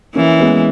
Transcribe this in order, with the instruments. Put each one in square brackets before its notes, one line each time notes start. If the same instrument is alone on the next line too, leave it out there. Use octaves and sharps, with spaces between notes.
[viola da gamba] E3 [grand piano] A#3 C#4
[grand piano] G#3 B3